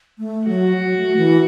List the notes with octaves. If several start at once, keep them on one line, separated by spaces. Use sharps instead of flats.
A3
F#3 F#4
F#3
A3
E3